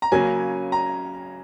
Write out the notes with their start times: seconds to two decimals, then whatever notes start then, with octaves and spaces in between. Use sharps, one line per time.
0.02 A#5
0.12 C#3 F#3 A#3 C#4 G#5
0.72 A#5